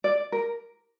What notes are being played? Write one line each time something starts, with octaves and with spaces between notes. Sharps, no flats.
D5
A#4